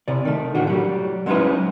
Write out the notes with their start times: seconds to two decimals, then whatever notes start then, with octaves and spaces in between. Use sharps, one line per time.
0.08 C2 C3 D5
0.25 D#3 A3
0.55 B1 A2 D3 F#4
0.67 F#3 G3
1.26 F#3 G#3 C#4 D#4 E4 B4